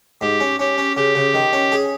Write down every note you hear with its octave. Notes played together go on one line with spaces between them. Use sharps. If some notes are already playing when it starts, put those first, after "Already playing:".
G#2 G4
C#4
C#4 G4
C#4
C#3 G4
C#3
D#3
C#4
G#4